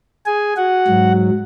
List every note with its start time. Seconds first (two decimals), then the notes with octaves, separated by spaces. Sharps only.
0.26 G#4 G#5
0.57 F#4 F#5
0.88 G#2 F#3